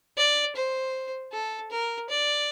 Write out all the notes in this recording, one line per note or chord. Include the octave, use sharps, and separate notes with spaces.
D5
C5
A4
A#4
D5